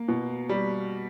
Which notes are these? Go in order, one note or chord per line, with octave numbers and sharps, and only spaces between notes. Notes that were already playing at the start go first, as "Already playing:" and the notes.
Already playing: A#3
B2
G3